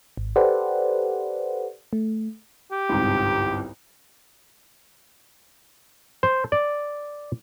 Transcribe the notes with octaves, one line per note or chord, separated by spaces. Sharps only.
G#1
G4 A4 B4 C5 D5 F#5
A3
G4
G1 C2 G#2
C5
D5